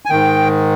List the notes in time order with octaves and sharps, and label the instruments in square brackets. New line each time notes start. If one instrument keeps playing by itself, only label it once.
[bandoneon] G#5
G#2 D#3 G5